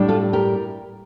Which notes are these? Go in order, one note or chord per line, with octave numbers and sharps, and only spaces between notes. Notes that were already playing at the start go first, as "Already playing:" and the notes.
Already playing: A2 G3 D4
F4 A4
G4 A#4